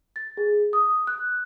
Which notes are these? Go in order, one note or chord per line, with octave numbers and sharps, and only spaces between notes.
A6
G#4
D#6
F#6